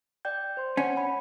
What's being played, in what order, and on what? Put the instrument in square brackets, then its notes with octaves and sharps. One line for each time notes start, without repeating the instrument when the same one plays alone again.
[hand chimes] D5 G5 G6
C5 C6
[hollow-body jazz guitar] C#4 [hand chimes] F#5
[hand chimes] B5